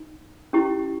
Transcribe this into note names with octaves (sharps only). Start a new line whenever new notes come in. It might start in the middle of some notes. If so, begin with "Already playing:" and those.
Already playing: D#4
C#4 E4 G4